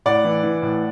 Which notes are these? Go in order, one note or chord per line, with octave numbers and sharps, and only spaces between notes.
A2 D5 F#5
E3
E3
A2